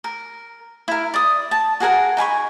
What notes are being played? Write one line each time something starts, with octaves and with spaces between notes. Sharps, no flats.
A#4
E4 A#4
D5 D#6
A5
F#4 G#4 A#4 F#5
D#4 G#5 B5 C#6